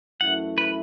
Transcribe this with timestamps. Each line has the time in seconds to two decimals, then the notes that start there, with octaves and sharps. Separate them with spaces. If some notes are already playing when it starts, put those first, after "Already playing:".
0.21 F#2 E3 A3 E4 F#5
0.58 B4